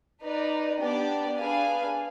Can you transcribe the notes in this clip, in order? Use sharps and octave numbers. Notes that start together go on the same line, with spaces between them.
D#4 B4 D5
B3 D4 G4 D5
D4 G#4 B4 F5 G#5